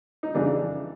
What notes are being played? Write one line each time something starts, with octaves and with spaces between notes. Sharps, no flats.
D#4
F2 C#3 E3 D4